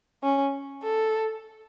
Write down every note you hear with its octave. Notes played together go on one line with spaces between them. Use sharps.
C#4
A4